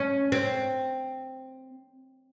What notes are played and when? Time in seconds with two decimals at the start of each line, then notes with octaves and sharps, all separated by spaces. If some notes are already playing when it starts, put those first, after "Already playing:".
Already playing: C#4
0.32 C4